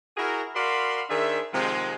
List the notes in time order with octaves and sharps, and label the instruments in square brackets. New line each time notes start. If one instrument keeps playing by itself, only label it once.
[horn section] E4 F#4 G#4 A#4
F#4 A#4 D5 F5 B5 C6
D#3 D4 G#4 C5 E5
C3 D#3 F3 G#3